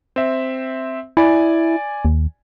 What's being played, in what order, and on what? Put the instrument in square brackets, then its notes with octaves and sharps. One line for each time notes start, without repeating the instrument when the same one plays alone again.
[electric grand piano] C4 E5
[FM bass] E4 [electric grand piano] D5 G#5
[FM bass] D#2